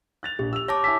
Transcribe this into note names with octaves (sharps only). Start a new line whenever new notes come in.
F#6 A6 F7
A#1 G4
E6 F7
C#5 A5 D6 A#6
E4 G#5 E6 B6